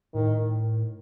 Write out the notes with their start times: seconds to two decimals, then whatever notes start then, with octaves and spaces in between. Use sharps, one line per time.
0.14 A2 D#3